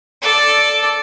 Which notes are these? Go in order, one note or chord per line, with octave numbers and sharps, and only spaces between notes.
A4 D5